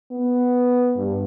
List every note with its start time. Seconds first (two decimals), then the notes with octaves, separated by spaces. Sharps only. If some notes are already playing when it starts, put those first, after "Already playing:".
0.11 B3
0.96 G2